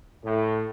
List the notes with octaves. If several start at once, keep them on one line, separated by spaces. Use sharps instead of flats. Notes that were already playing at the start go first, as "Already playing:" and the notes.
A2